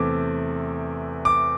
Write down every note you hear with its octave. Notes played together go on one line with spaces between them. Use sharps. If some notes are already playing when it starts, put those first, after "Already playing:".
Already playing: E2 C3 A3 C4 D6
D6